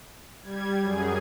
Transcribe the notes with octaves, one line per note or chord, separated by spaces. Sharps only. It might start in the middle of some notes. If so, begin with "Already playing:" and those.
G3 G#6
F#2 G#4